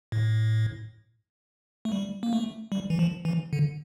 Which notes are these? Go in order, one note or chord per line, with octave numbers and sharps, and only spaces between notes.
A2
A3
G3
A#3
A3
G3
E3
F3
E3
D3